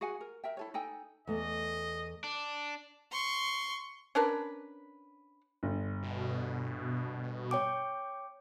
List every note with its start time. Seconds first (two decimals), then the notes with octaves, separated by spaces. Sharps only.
0.01 F#4 G#4 F#5 G#5
0.21 A#4
0.44 A#4 E5 G5
0.57 E4 A4 C#5
0.74 D#4 A4 G5 G#5
1.27 E2 A3 D#5
2.24 D4
3.12 C6 C#6
4.15 C#4 D4 A#4 B4
5.63 G1
6.03 B2
7.51 C#5 G5 D6